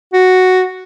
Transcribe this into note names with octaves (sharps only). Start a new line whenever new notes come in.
F#4